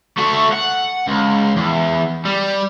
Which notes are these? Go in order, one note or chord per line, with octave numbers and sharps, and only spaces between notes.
A3 F#4
F#5
C#2
E2
G3